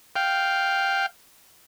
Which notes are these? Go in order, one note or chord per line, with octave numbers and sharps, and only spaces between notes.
F5 G5